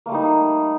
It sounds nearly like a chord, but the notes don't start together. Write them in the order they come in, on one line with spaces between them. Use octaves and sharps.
A#3 A3 G3 D#4